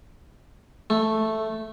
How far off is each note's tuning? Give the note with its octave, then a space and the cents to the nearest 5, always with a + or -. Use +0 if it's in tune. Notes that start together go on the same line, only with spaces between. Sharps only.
A3 +0 C#6 -30